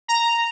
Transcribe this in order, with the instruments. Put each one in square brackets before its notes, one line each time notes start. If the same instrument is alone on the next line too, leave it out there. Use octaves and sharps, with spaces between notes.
[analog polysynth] A#5